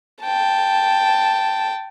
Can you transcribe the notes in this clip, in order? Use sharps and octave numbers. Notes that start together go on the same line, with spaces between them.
G5 A5